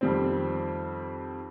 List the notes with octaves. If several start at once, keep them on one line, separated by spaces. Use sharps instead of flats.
F2 D#3 G3 C4